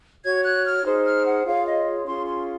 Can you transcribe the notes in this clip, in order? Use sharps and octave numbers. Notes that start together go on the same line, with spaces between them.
F#4 C#5 G#6
F#6
F6
D#4 G#4 C5
F6
F#5
F4 G#4 C#5 F5
D#5
C#4 F4 G#4 C6
C6